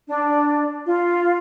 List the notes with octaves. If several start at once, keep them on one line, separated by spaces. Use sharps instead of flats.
D4
F4